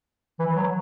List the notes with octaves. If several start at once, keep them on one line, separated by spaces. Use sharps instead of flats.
E3
F#3